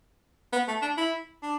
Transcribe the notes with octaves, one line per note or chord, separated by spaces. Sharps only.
B3
A3
D4
E4
D4